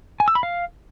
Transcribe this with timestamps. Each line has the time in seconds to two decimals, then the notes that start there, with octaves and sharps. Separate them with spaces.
0.20 G#5
0.28 E6
0.35 B5
0.43 F5